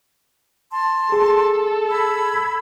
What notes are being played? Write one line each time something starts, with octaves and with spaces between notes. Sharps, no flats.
A5 C6
G#4 A4
B5 E6 G#6